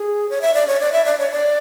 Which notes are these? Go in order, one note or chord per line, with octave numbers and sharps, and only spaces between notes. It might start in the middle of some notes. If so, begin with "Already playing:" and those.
Already playing: G#4
C#5
E5
D5
C#5
D5
E5
D5
C#5
D5